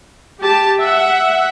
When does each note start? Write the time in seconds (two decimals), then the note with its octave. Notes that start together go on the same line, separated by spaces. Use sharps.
0.39 G4 A5
0.80 E5 F#5